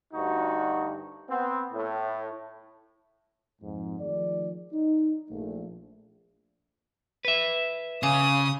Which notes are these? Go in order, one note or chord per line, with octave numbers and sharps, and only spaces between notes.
D2 G2 D#4 F#4
B3 C4
A2
F2 G#2
D#3 F3 A3 G#4 D5
D#4
A#1 A3
B4 E5
C#3 F5 G#5 D6 D#6